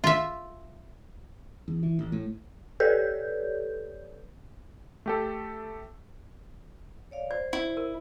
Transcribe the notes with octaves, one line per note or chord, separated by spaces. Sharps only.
F4 E5
E2
E3
A1
A2
G4 A4 B4 C#5 D5 G6
A3 G4 A4
C#5 D5 F5
C5 D5
E4
A#4